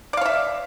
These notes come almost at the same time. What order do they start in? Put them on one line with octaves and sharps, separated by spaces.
D5 F5 C#5 E5